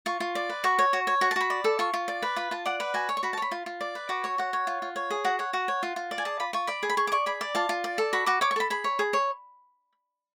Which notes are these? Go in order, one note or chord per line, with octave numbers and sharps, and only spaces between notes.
F4 C#6
F4
D5
B4
F#4 C#6
C#5
F#4
C#5
F#4 C#6
A5
F#4 B5
D5
A4
F4 C#6
F4
D5
B4
F4 B5
F4 A5
D5 F#5
B4 F#5
F#4 G#5
C#5
C#6
F#4 B5
A5
C#5 B5
F4
F4
D5
B4
F#4 D6
C#5 C#6
F#4 F#5
C#5
F4
F4
C#5
G#4
F#4 F#5
C#5 F#5
F#4 F#5
C#5
F4
F4
D5
G#5
G#4 A5
F4 B5
F4 C#6
D5 B5
G#4
B5
G#4 C#6
D6
D5 C#6
G#4 B5
D5
F4 A5
F4
D5
A4
F#4 B5
F#4 D6
C#5 D6
C#6
A4 B5
G#4 B5
C#5
G#4
C#5